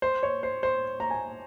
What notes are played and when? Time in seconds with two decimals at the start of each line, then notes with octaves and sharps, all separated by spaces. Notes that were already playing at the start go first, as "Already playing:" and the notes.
0.02 C5
0.23 C#5
0.43 C5
0.63 C5
1.00 A#5
1.11 G#5